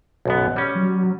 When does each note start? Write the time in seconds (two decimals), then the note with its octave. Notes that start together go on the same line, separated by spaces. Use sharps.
0.25 B1 F#2 B3
0.56 G3 C#4
0.75 F#3